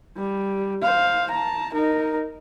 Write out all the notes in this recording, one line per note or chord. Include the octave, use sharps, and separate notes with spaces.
G3
C5 F5
A5 A#5
D#4 A#4